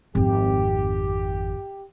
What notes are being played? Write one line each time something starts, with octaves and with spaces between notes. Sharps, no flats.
G#1 F2 G4